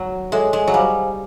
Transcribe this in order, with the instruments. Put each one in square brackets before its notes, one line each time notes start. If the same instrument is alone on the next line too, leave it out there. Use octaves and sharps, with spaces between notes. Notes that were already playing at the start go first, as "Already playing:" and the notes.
Already playing: [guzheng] F#3
[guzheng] G#3 [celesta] A4 C#5 E5
[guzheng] G#3
F#3
[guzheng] G3 [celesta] C5 F5 G#5